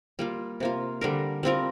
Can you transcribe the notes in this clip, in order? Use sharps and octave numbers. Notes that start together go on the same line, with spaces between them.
G3 A#3 F4
C3 A#3 F4
D3 G3 D4 A#4
G3 C4 F4 A#4